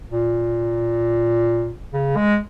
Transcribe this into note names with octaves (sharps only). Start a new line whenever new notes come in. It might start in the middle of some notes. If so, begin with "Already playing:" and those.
A#2
C#3
G#3